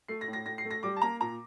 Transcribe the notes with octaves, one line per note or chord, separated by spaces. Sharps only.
A3 C7
A#6
A2
A#6
A2 A#6
C7
A3
A#6
G3 D6
A5
A#3 A#5
A#2 A#5